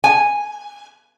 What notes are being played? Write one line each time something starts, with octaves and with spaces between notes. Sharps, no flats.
G#5